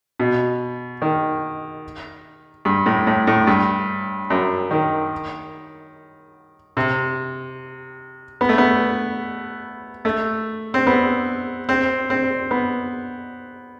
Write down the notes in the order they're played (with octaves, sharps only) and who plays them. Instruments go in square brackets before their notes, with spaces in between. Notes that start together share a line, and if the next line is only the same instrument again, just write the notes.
[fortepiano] B2
D#3
G2
A2
A2
A2
G2
F#2
D#3
C3
B3
A3
B3
A3
C4
B3
C4
C4
B3